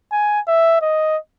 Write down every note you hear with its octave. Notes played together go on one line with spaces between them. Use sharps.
G#5
E5
D#5